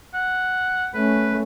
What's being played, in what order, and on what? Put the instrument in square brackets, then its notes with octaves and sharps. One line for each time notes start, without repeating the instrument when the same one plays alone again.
[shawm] F#5
[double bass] A3 C#4 [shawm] B4